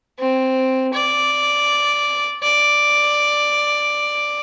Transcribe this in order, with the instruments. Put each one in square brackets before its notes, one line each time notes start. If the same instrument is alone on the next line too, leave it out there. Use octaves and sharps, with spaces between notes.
[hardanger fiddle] C4
D5
D5